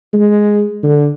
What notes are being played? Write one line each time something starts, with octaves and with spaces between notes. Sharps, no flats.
G#3
D3